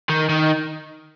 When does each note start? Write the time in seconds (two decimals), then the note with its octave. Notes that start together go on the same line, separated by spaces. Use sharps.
0.09 D#3
0.29 D#3